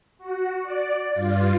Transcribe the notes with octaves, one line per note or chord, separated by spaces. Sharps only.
F#4
D5
G2 F4